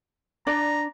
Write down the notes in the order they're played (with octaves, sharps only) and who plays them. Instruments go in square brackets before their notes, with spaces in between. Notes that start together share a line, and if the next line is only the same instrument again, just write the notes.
[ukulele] D4 D5 [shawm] A#5